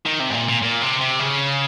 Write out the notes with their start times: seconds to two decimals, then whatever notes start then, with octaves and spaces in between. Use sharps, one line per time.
0.06 D#3
0.20 C3
0.30 G#2
0.34 A#2
0.49 A#2
0.62 A#2
0.82 C3
1.00 C3
1.19 C#3